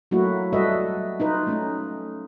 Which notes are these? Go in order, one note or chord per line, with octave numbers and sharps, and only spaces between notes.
F#3 A3 A#3 E4 F#4
G3 F#4 A4 B4 D#5 E5
D#4 F4 B4
A3 C#4 D#4